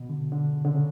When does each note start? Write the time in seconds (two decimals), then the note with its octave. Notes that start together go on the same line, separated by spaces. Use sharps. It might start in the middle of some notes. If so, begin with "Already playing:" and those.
Already playing: B2
0.09 D3
0.32 D3
0.53 C#3
0.65 D3
0.74 C#3